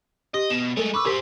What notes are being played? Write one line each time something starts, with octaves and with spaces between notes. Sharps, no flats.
G4 D#5
B2 E7
G#3 A3 A4 A#4
B4 C#6 D6 E6
G4 G#4 A#4 C5 B6